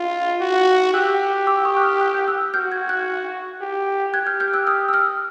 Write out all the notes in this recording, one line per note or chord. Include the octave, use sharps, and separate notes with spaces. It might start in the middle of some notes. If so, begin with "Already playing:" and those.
Already playing: F4
F#4
G4 E6 F#6
D6 E6
C#6 D#6
F#6
D#6 F6
F#6
G6
E6 F#6
F#4 F6 G6
F#6 G#6
F#6 G#6
G4
G4 F#6 G#6
F6 G6
F6 G6
E6 F#6
D#6 F6
E6
D#6 F6